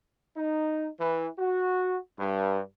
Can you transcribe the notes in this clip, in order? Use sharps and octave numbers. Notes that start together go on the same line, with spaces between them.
D#4
E3
F#4
G2